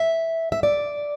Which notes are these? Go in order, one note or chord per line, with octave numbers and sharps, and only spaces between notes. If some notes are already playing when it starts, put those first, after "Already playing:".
Already playing: E5
E5
D5